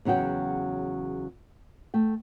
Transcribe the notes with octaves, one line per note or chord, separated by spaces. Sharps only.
E2 C#3 F#3 F#4 G5
A3 G5